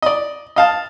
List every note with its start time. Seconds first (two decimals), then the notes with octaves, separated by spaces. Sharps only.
0.02 D5 D#5
0.56 D#5 F5 A5